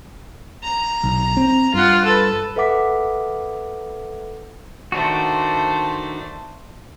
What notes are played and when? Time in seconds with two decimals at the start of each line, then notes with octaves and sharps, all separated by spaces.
0.63 A#5
1.04 B1
1.37 C4
1.74 G2 F4 F#5
2.05 A4 B4
2.56 A4 B4 E5 F#5 D6 B6
4.92 D#3 A3 D4 F#4 C5